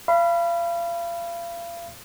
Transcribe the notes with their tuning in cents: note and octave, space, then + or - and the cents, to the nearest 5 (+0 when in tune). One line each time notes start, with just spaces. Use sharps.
F5 -35 B5 +0